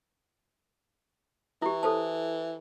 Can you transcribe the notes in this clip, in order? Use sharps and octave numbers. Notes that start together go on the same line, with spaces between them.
E3 E4 G4
A4 C5 A5